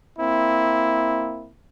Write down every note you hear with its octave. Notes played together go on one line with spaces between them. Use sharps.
A#3 C4 E4